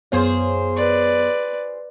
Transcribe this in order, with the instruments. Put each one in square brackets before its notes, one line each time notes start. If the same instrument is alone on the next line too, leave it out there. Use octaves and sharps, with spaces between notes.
[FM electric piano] F#2 B3 C#5 [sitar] F4 G#4 C5
[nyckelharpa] B4 D5